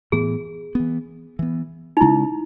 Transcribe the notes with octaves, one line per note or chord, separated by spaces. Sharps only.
A2 E3 B3 G#4
E3 B3
E3 B3
D#4
C#3 G#3 C#4 E4